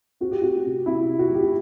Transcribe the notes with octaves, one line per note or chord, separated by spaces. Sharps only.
C4 F#4
G4
C4 F#4
C3
C3 E4
C3
F#4
F#3
G4
F#4